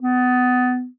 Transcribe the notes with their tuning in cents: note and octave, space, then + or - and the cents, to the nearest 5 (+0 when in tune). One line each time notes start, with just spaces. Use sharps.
B3 +20